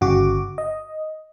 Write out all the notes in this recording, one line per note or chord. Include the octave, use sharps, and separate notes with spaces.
G1 C#3 F#4 D6
D#5